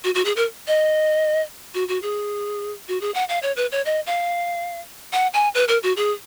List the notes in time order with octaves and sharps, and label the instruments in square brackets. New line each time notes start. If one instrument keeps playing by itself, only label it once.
[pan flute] F#4
F#4
G#4
A#4
D#5
F#4
F#4
G#4
F#4
G#4
F#5
F5
C#5
B4
C#5
D#5
F5
F#5
G#5
B4
A#4
F#4
G#4